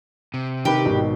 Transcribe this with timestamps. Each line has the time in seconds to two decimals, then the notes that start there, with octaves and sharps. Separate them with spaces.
0.34 C3
0.65 D#3 G4 B4
0.86 G#1 B2 D#3